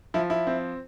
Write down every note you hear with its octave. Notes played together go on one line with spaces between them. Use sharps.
F3 E4
E4
C4